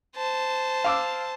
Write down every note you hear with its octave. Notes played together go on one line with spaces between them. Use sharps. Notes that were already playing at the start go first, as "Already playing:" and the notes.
C5 A5
F5 D6 E6